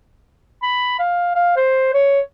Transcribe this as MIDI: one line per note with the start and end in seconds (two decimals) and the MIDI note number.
0.62 0.95 83
0.99 1.33 77
1.35 1.53 77
1.57 1.93 72
1.94 2.20 73